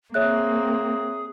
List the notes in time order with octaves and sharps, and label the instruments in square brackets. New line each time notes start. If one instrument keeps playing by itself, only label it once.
[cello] A#3 C4 [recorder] G#4 [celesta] C#5 E5 F#6